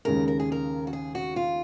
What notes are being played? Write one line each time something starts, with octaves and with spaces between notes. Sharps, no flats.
D#2 C#3 G#3 A#4
A#4
G#4
A#4
F#4
G#4
F#4
F4